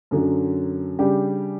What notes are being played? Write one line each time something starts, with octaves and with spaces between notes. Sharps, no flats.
F#2 D3 F#3
C#3 G3 D4 G4